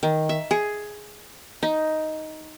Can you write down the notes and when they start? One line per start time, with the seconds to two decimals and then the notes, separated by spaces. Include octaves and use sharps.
0.03 D#3
0.29 E5
0.51 G#4
1.63 D#4